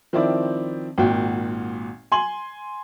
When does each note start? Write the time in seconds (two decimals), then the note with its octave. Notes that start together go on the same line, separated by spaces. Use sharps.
0.13 D#3 F3 C4 E4 D5
0.98 G#1 A#2 F#4 G5
2.12 G#5 C6 F#7